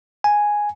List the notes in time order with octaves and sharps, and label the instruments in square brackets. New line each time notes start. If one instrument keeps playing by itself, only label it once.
[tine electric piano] G#5